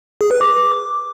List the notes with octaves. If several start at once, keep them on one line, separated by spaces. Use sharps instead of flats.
G#4
B4
D6